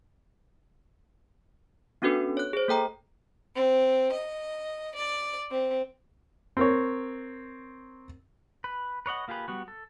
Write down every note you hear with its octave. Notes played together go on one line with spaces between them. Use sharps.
B3 C#4 D4 F#4 A4 B4
C#5 F#6
G#4 C5
A#3 A4 G5 A#5
C4
D#5
D5
C4
C4 A#4 C#5
B4
B4 C#5 D#5 F#5
A#3 F4 G4 G#4 B4
G3 B3 F#4
A4